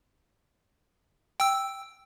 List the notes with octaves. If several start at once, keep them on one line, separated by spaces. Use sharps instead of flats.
G5 E6